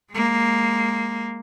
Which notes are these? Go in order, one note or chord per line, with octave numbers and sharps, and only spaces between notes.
G#3 A#3